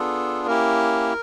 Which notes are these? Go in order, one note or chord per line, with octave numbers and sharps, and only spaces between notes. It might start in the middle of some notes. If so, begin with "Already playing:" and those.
Already playing: B3 D4 F4 G#4 A4
A#3 C#4 E4 G4 A#4